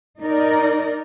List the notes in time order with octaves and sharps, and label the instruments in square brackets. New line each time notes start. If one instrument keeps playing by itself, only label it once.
[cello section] D#4 A#4 D5